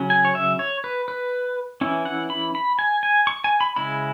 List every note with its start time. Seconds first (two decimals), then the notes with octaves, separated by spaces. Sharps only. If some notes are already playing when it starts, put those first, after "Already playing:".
Already playing: C#3 F#3 C#4
0.10 G#5
0.25 C#5
0.35 E5
0.59 C#5
0.84 B4
1.08 B4
1.81 E3 C#4 E4
2.05 F#5
2.30 B5
2.55 B5
2.79 G#5
3.03 G#5
3.27 C#6
3.44 G#5
3.61 B5
3.76 C#3 G#3 E4 B5